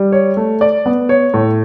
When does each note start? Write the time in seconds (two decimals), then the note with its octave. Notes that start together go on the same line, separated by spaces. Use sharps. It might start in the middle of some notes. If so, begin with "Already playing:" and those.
Already playing: G3
0.12 C#5
0.37 A3
0.61 D5
0.86 B3
1.09 C#5
1.34 A2